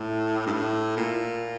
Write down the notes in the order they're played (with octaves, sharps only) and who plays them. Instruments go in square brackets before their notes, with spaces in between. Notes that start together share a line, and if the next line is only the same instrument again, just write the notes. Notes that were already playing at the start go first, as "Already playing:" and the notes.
Already playing: [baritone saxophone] A2
G2
A2
A#2